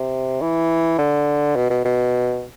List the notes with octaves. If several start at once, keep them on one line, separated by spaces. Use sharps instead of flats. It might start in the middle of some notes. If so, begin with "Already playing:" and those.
Already playing: C3
E3
D3
B2
B2
B2